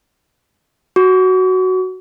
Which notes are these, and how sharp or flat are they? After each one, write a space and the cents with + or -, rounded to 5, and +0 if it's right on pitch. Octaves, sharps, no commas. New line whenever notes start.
F#4 +5 C#6 +45